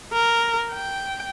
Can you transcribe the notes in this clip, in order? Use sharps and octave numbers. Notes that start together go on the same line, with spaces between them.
A#4
G5